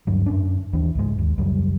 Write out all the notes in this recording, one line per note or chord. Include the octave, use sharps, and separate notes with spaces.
D2 G2 F#3
F#2 C#4 D4
D#2 E3 D4
C#2 G#2 G#3
D#2
C#2 F#2 G3